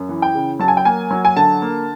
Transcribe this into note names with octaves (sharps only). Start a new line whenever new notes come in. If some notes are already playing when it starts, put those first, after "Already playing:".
Already playing: F#2
E3
G5
C#3
F#3 A5
G#5
G5
A#3 G#5
F#3
G#5
D3 A5
A#3